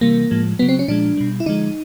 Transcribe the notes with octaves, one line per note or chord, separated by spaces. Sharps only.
C3 E3 G3 A#3
A2 F3 G#3
C#3 F#3 B3
C4
C#4
A#2 F3 G#3 D4
B2 G3
E4
D3 F3 G#3 D#4